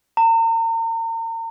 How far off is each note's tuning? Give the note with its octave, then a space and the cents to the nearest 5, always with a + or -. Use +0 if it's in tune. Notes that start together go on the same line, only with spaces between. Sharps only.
A#5 -40